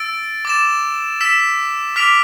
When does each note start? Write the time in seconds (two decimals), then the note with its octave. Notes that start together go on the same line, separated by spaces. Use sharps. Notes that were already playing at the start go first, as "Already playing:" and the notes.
Already playing: E6 A6 D7
0.45 D6 A6 E7
1.21 E6 B6 E7
1.96 D6 F6 B6 D7 F7